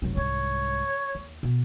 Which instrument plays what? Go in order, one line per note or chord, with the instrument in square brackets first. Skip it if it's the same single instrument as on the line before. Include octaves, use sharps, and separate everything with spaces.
[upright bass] F1 F#3
[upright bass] C2 G#2 [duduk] C#5
[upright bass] D#2
B2